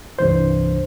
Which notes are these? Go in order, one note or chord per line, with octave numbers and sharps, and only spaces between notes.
C2 G2 E3 C5